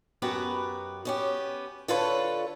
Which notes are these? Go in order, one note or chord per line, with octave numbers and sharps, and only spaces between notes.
F#2 B3 F#4 G4 B4
B3 C#4 G4
D3 F4 A4 B4 C#5